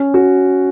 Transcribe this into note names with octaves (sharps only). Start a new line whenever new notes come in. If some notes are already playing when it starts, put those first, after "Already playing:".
Already playing: C#4
F#4